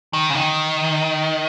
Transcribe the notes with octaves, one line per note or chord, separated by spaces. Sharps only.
D#3
C#3
D#3